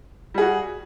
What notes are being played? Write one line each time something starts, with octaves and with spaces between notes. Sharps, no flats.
G3 F#4 G#4